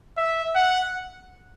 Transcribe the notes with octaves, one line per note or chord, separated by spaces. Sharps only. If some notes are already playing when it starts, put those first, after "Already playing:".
E5
F#5